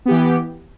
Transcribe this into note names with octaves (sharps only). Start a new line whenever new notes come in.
E3 B3 G4